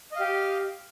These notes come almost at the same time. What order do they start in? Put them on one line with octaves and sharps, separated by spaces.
D#5 F5 G4